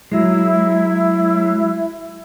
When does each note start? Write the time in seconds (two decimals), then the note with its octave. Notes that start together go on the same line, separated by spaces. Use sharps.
0.12 F#3 G#3 E4